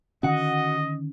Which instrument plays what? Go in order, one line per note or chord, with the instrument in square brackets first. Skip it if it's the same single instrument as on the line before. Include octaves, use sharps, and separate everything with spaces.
[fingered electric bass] D3 D#3 C#4 [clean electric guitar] F#4 F#5 [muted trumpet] D#5